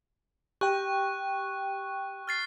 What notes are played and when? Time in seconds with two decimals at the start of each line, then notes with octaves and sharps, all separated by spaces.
0.61 G4 G5 C#6 F#6
2.28 F6 A6 C7